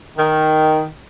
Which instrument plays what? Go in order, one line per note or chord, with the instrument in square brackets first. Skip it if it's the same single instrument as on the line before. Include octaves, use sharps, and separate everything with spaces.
[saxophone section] D#3